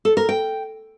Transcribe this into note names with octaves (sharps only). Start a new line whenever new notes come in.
A4
A#4
G5